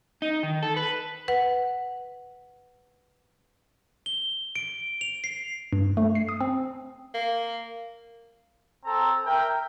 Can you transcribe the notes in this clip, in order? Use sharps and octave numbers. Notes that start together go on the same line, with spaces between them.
D#4
D#3
A4
B4
B4 F#5
G7
D7
F7
C7
G2
A3
C7
D#6
C4
A#3
C4 A4 A#5
A#4 E5 G5